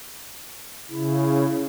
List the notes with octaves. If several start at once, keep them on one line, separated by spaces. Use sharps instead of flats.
C#3 E4